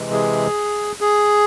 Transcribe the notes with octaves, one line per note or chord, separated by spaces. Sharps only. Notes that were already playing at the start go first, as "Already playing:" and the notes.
Already playing: C3 E3 G#3
G#4
G#4